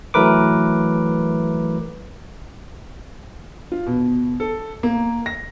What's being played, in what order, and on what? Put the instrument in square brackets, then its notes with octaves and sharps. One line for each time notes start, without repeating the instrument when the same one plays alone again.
[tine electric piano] E3 F#3 A3 A#4 B4 D6
[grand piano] F4
B2
A4
A#3
A#6